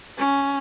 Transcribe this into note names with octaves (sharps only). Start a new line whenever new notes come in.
C#4